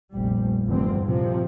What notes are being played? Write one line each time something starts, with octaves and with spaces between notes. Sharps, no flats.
F1 A#1 G3
F1 E2 G2 D3 C4
A#1 C3 F3